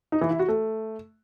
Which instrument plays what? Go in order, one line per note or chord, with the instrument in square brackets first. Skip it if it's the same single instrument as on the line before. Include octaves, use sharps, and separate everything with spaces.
[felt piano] D#4
E3
E4
F#4
A3